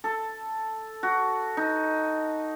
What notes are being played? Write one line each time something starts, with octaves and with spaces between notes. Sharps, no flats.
A4
F#4
D#4